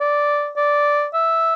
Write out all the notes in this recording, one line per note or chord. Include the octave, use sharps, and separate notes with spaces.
D5
D5
E5